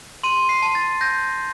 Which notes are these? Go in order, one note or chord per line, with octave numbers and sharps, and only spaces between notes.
C6 D#7
C7
A5
A6
G6 A#6